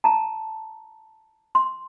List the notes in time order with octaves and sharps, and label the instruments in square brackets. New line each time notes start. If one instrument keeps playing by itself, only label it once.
[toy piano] A5 A#5
C6